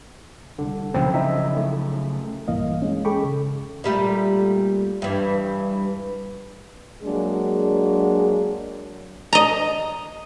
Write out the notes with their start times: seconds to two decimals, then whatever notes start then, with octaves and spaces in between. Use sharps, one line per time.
0.59 C2 D3
0.94 C#3 F3 F#3 C4 D#4
1.14 D#4 E4 E5
1.57 A3
2.48 A#1 G2 E3 A#3 D#5 F5
2.82 G#3 C#4
3.05 G#4 A4 G5 B5 C#6 D6
3.24 C#3
3.84 A#2 G3 A3
5.02 G2 E3
7.03 F#3 G#3 A#3 D4 G#4
9.33 D#5 A#5